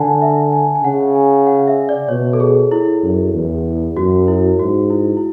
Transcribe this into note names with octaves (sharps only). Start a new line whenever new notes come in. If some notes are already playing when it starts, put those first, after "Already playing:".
Already playing: D3 F#5 G#5 A5
E5
G#5
G#5
C#3 F#5
G#5
F#5
E5
D5
B2 C#5
A4
G#4
E4
F#2
E2
F#2 F#4
E4
G#2 F#4
E4
E4